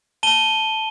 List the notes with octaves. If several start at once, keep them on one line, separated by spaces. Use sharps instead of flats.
A5 D#7 G7